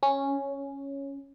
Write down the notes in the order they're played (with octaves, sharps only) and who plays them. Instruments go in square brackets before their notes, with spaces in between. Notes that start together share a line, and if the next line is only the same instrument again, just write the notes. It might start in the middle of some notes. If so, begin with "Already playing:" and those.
[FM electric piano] C#4